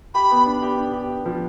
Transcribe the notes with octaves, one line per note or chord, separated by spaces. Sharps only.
G4 B5
B3
D4
G4
D4
G4
G4
F3